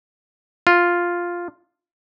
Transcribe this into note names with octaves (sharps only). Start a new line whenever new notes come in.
F4